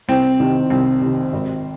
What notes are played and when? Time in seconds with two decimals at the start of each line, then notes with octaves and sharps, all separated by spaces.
0.08 C2 C4
0.40 C3 D#3
0.70 C2 C4
1.01 C3 D#3
1.33 G#1